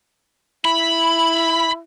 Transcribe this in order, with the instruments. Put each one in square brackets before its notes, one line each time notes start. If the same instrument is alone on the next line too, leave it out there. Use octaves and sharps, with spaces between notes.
[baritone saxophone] E4 [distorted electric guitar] B5